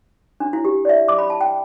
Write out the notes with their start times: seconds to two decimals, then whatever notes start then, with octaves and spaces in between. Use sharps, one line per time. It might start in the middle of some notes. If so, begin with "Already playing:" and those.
0.40 D4
0.53 E4
0.65 G4
0.85 D5
0.89 E5
1.08 D6
1.19 B5
1.30 A5
1.41 G5